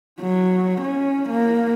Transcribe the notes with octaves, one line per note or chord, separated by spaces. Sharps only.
F#3
C#4
A#3